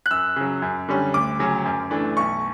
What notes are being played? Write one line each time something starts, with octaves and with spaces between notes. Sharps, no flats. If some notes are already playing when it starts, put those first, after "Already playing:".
F#6
F#2 E6
C#3 F#3
F#2
D3 G3 C#4
D2 D6
C#3 F#3 C#4
F#2
E3 A3 D4
B1 C#6